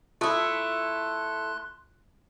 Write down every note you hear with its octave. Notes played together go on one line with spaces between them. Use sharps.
A3 E4 F4 A5 C6 D#6 F#6